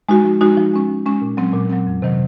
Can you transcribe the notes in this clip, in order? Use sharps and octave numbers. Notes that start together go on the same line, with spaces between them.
G#3 D#4 F#4
F3
G#3 D#4 F#4
F3
G#3 C#4
F3
G#3 C#4
A#2
F#3 C4
A#2
F#3 C4
F2
C3 D#3 F#3